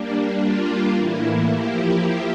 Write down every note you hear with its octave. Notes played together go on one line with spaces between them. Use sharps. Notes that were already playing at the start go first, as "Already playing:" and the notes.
Already playing: G3 A#3 D4
G3 A#3 D4 F4
A2 E3 A#3 E4
F3 A#3 E4 G4